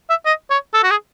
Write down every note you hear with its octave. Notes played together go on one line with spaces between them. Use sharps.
E5
D#5
C#5
A4
F#4
G#4